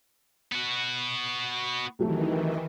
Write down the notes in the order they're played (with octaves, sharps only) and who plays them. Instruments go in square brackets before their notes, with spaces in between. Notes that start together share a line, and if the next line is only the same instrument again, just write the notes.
[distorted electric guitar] B3 F#4
[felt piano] C2 F#3 A3 [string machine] D#3 E3